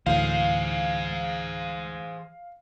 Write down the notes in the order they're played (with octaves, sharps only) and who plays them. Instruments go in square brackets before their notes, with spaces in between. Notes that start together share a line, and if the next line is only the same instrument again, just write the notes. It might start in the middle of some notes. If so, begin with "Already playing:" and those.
[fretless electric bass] D2 A2 [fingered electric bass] E3 [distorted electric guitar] G#4 C5 [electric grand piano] F5